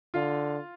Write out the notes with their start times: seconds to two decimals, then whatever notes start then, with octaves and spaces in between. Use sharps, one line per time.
0.14 D3 F4 F5